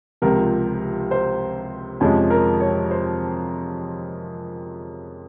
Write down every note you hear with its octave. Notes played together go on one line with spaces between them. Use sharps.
C#2 C3 F3 A#4
C5
F2 C3 F3 G#3 C#4
A#4
C#5
C5